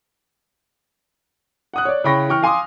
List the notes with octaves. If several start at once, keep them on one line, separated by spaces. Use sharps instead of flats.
F#5 D#6 F#6
C#5 D5
C#3 E4 G5 B5 C#6 A#6
E3 G5 C#6 F6
F5 G#5 C6 D6 D#6